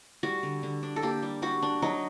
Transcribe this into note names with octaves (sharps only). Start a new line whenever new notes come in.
G3 F#4
D3
D3
D4
A4
A#3 G4
G3
G3 F#4
D4
F#3 D#4